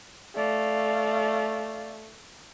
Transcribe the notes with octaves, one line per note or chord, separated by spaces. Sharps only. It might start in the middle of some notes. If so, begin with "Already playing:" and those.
A3 D5 F5